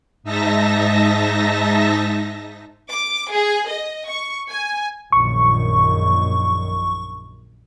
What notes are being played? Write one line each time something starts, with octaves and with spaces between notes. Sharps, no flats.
G#2 D#4 E5 A5 A#6
D6
G#4
D#5
C#6
G#5
A#1 F#2 D#3 C#6